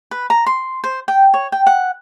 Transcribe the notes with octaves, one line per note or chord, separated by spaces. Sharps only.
B4
A#5
C6
C5
G5
C#5
G5
F#5